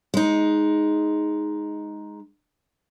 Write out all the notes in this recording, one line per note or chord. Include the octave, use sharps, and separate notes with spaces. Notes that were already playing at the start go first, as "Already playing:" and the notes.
G#3 D#4